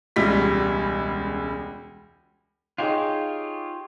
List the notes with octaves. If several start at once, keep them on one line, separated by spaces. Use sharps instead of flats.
E1 C#2 G3 B6
D#4 F4 G4 G#4 C#5